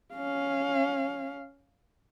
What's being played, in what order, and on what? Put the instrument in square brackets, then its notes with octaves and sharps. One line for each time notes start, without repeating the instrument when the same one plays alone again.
[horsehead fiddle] C#4 F5